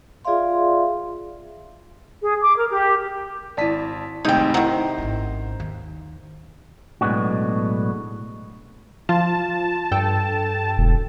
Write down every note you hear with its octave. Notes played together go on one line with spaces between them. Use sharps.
F4 G#4 D5 E5 F5 C6
G#4
D6
A#4
G4
G#1 E4 D5 A5 B6
G#1 C3 G#3 A3 D#4 G5 G#6
D#3
C3 D#3 A3 C4 E4 C5 F#5 A#5
G#1 C#4
D#2
B1 A2 G#3 B3 D4 F#4
F3 F4 A5
G2 A4 G5
E1